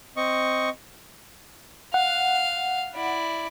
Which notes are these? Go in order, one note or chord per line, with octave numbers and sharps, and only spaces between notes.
C4 D#5 C#6
F5 F#5
E4 D5